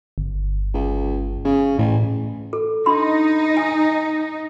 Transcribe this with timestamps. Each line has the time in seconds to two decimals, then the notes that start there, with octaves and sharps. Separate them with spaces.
0.18 G1
0.74 C#2
1.45 C#3
1.79 A1 A2
2.53 A4
2.86 D4 D#4 B5 C6
3.57 G#5